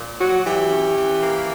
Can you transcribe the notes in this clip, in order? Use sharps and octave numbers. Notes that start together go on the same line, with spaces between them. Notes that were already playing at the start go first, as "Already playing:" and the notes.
Already playing: A#2
F#3 F#4
E3 G4
C#4
E3
A#3